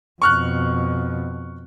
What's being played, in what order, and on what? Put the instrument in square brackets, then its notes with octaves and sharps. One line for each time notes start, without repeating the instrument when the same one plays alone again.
[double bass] F2 B2 [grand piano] C#6 F6 F#6